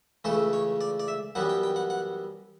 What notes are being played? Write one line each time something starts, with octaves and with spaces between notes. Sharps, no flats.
C#2 C#3 E3 A3 A4
C#5
D5
D5
E5
F#2 E3 G3 B3 F#5
G5
G5
F#5
F#5